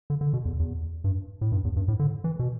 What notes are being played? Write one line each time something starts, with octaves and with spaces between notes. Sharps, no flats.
D3
D3
B2
E2
E2
G2
A2
G2
E2
G2
A2
D3
E3
B2